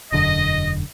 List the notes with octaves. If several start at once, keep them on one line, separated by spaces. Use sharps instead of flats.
E1 F#2 D3 D#5